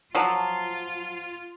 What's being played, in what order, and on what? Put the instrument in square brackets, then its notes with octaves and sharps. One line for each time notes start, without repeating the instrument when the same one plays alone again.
[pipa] F3 F#3 [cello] F4